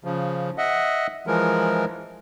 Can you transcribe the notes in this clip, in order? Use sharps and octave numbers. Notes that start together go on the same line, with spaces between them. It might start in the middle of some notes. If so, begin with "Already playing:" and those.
C#3 F3
D#5 E5 F#5
E3 F3 G#3 A#4